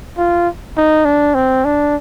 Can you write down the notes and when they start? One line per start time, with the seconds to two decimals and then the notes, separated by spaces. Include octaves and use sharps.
0.18 F4
0.77 D#4
1.05 D4
1.35 C4
1.65 D4